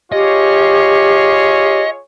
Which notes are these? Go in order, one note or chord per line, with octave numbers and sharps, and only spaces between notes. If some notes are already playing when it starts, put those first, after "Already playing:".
F4 G4 G#4 C#5 D#5